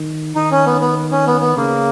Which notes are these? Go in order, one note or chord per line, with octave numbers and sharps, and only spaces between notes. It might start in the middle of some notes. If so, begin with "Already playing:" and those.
Already playing: D#3
D#3 D#4
C#4
B3
B3
C#4
B3
B3
C#3 A#3